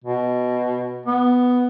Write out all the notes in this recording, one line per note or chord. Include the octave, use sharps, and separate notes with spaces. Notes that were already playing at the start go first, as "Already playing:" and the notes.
B2
B3